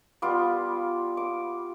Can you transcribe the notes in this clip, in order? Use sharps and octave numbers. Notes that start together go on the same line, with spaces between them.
G3 B3 F4 D6
D6